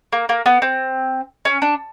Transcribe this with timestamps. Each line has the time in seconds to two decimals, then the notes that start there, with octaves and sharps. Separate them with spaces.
0.13 A#3
0.29 A#3
0.46 B3
0.62 C4
1.45 C#4
1.62 D4